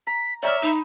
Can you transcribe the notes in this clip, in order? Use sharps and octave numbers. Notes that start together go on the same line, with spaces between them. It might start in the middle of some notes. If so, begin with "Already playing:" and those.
A#5 B6
C#5 D5 E5 G5 A#5 D6 E6 F6
D#4 D#5 B5 E7